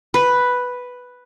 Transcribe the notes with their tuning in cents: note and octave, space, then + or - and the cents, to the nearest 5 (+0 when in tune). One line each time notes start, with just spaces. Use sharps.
B4 +0